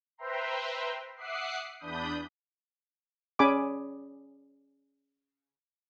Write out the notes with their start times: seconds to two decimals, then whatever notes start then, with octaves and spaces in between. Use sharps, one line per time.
0.18 B4 C5 E5 G5 A#5 C6
1.17 E5 F#5 D6 D#6 F#6 C7
1.80 E2 D4 B5 D#6 G6
3.39 C#4 G#4 D5 G#5 B5 D6